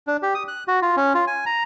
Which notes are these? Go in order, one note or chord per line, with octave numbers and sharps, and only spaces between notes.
D4
G4
D#6
F#6
F#4
F4
C#4
F4
G#5
A#5